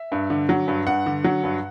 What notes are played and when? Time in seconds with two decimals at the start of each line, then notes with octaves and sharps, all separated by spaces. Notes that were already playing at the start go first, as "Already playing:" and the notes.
Already playing: E5
0.12 G2
0.30 D3
0.49 F#3
0.68 G2
0.87 G2 F#5
1.06 D3
1.24 F#3
1.44 G2